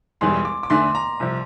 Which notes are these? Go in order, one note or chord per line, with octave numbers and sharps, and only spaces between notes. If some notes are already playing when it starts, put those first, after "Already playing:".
E1 E2 E3 G3 C6
D6
D6
E2 D3 A3 C6
A#5
C2 C3 F3